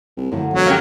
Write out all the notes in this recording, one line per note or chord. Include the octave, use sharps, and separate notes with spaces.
C2
F#2 A2 D3 F3
E1 F#3
A#3 C#4 G4